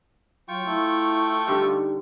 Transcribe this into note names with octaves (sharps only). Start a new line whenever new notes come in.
F#3 F4 G5 C#6
A3 E4
D3 G3 D#4